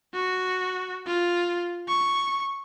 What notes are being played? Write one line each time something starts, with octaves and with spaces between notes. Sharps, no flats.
F#4
F4
C#6